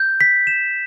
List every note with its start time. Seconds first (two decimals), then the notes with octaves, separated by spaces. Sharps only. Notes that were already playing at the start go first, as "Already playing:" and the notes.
Already playing: G6
0.21 B6
0.47 E7